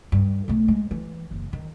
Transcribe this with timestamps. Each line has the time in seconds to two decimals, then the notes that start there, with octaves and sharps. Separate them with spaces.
0.12 G2
0.48 B1 A3
0.68 G#3
0.91 E3
1.31 F#1
1.53 D#3